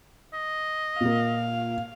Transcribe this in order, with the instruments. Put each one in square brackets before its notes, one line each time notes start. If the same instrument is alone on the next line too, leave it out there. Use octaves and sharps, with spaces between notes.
[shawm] D#5
[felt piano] A#2 A#3 [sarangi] F5